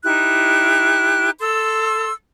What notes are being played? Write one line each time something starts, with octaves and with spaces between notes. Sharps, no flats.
D#4 E4 G4 F#6
A4 C6 E6